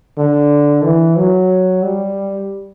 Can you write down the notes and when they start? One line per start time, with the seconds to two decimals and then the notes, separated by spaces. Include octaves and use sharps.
0.18 D3
0.84 E3
1.17 F#3
1.83 G3